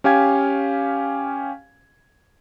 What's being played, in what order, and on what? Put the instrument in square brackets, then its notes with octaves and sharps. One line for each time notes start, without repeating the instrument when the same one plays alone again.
[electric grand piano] C#4 G4 F5 G#5 G#6